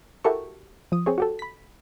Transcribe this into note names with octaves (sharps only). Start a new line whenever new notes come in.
E4 F#4 G4 A4 A#4 C#6
F3 D#6
C4 G#4 C#5
F#4 G4 A4
B5 B6